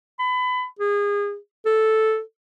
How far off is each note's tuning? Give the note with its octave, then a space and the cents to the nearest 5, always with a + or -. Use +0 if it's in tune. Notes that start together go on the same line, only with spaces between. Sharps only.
B5 +25
G#4 -30
A4 -5